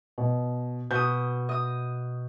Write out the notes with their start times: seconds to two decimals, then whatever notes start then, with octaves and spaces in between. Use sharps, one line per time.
0.18 B2
0.91 B2 D#6 G6
1.49 D#5 D#6